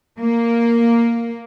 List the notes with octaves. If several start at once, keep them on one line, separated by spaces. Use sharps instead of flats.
A#3